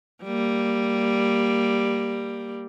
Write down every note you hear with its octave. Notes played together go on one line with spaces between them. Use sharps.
G3 A#3